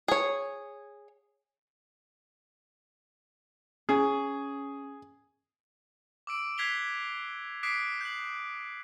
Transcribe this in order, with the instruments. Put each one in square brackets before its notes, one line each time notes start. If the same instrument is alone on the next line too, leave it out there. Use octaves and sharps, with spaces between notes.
[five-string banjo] G#4 C#5
[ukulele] C#4 [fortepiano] G#4
[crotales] D6 E6 D7
F#6 G#6 B6 C7 F7 G7
D6 D#6 F#6 B6 C7 D7
G6 F#7